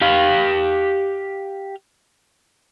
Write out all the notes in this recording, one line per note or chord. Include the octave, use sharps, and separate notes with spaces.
G4 F5